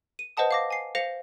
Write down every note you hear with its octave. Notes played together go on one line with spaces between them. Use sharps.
D#7
B4 C5 D#5 F#5 A5 D#6
F5 D6 A#6
G#5 C7
C5 F5 A#6 C#7 F7